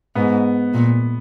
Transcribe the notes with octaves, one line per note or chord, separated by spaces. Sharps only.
G#2 B3
A#2